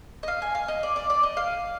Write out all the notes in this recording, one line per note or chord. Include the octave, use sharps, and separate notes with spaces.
D#5
F5
G#5
F5
D#5
D5
D5
D5
D#5
F5